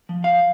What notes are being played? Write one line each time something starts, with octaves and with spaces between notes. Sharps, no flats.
F3
F5